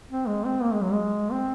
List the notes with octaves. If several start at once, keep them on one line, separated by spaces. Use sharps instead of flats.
C4
G#3
C4
A#3
G#3
F#3
G#3
C4